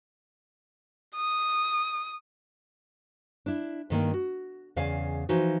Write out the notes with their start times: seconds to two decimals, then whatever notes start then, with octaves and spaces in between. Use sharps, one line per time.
1.16 D#6
3.46 D4 E4
3.90 G2 D#3 A#3 G5
4.14 F#4
4.76 E2 C#3 D5 F5 G#5
5.29 E3 F3 D#4 F#4